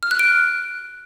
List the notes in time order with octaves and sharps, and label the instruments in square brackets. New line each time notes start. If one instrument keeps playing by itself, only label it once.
[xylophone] F6
F#6
D7